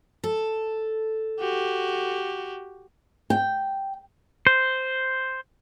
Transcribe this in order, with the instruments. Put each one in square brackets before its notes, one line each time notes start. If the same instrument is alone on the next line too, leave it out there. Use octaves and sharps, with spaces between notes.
[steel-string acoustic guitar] A4
[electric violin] F#4 G4
[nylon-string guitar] G5
[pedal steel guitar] C5